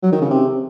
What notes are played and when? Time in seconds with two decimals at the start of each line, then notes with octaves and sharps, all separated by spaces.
0.03 F#3
0.12 D#3
0.21 C#3
0.30 C3